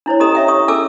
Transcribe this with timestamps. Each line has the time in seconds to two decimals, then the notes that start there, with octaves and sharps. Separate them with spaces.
0.06 D4 E4 C5 C#5
0.20 C#4 G4 A4 D#5 A#5 D#6
0.35 C#5 E5 G5
0.48 C#5 C#6 D#6
0.68 C#4 G#4 A4 G#5 D6 E6